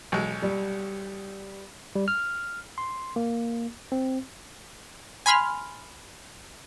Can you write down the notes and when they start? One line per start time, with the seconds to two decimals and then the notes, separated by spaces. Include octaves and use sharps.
0.12 B1 G#3
0.42 G3
1.95 G3
2.08 F6
2.78 C6
3.16 A#3
3.92 C4
5.26 G#5 B5 C6 F6